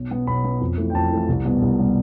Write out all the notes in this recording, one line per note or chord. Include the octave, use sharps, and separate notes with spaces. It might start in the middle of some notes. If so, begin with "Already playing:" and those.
Already playing: B1
B2 B3
B1 B5
B2 B3
F2
E3 A3
G5
F2 A5
E3 A3
C2
B2 G3 B3
C2
B2 G3 B3